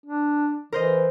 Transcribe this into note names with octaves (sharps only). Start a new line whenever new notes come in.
D4
E3 A#4 C5 D#5